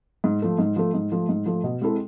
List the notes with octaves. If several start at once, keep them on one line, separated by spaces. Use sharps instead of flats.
G#2
F3 A3
G#2
F3 A3
G#2
F3 A3
G#2
F3 A3
B2
G#3 C4 E4 A4